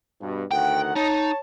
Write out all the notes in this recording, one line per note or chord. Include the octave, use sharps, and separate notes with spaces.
G2 B2
D2 D#3 F#5 G5
D#4 C#5 A5